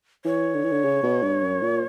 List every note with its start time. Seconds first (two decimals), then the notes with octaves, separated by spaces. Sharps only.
0.25 E3 C#5
0.55 D3
0.64 E3
0.71 D3
0.84 C#3
1.03 B2
1.23 G2
1.42 F#2
1.62 A#2